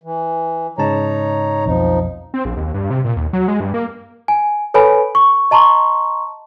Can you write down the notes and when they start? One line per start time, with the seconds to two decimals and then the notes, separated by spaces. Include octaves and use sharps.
0.03 E3
0.78 G#2 C#3 D#4 C#5 A5 A#5
1.66 B1 F2 F3 D#4
2.34 C4
2.45 A#1
2.57 D#2
2.74 G2
2.90 C3
3.05 A#2
3.17 D#2
3.33 F#3
3.48 G#3
3.60 G2
3.74 A#3
4.28 G#5
4.74 A4 B4 C#5 G#5 B5
5.15 C#6
5.51 D#5 A5 A#5 C6 C#6